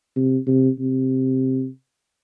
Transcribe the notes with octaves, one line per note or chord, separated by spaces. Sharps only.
C3
C3
C3